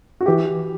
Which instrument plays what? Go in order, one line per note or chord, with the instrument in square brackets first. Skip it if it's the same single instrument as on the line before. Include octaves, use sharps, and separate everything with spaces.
[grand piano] F#4
[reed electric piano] E3 [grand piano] G4